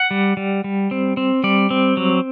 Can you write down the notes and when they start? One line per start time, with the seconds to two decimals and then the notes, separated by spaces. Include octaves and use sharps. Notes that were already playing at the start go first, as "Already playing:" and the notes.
Already playing: F#5
0.11 G3
0.37 G3
0.64 G3
0.91 C4
1.17 C4
1.44 G3 D5
1.70 C4
1.97 F#3